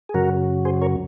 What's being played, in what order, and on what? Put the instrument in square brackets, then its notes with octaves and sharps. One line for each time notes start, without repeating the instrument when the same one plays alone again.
[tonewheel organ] G#4
F#2 C#3 F#3 F#4 A#4
G#4 C5
A#4 C#5